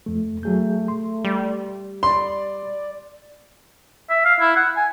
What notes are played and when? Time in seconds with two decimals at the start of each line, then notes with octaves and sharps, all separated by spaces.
0.06 F2 A3
0.43 F#3 A3 G#4 G6
0.88 C6
1.25 G3
2.03 D5 B5 C6
4.10 E5
4.25 F5
4.41 E4
4.56 F#5
4.76 G#5